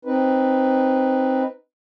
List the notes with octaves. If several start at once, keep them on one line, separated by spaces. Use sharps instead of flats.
C4 D#4 B4